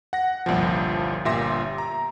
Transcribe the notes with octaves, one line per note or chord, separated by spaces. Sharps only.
F#5 A#6
G1 C2 A#2 F3
G1 A#2 G4 E5 C6 A#6
A#5